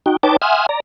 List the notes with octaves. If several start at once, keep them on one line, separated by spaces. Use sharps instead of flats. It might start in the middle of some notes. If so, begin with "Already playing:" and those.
D#4 F#4 G5
D#4 B4 C#5 G5 A5 D6
E5 F#5 G#5 C6 D#6 F6
D5 A#5